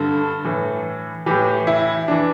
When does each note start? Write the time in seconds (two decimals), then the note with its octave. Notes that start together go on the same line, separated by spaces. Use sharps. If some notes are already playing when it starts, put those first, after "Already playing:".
Already playing: G2 D3 A4
0.44 A2 E3
1.26 A2 E3 G4
1.67 E4
2.08 E3 D4